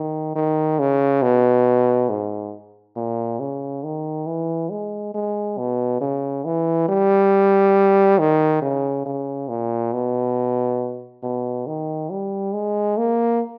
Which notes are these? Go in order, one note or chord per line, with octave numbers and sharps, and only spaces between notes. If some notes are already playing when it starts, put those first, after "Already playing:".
Already playing: D#3
D#3
C#3
B2
G#2
A#2
C#3
D#3
E3
G#3
G#3
B2
C#3
E3
G3
D#3
C#3
C#3
A#2
B2
B2
D#3
G3
G#3
A#3